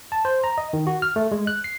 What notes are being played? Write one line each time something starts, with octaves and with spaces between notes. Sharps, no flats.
A5
C5
A#5
D#5
D#3
F#4
F6
A3
G#3
F#6
C7